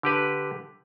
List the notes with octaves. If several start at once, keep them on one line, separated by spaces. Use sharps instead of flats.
D3 G4 B4